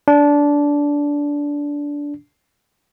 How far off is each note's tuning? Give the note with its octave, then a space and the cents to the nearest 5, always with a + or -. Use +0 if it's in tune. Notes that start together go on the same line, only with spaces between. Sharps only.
D4 -15